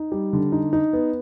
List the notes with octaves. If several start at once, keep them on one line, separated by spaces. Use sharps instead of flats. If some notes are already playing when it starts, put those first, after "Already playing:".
Already playing: D#4
G3
D3
D#4
D#4
B3